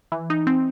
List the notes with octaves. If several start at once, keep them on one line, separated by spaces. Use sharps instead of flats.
E3
D#4
C4